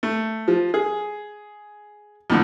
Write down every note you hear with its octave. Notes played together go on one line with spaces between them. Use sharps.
A3
F3
G#4
F2 A2 D3